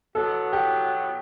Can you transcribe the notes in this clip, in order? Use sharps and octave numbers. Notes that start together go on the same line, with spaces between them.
B2 F#3 B3 F#4 A4
G4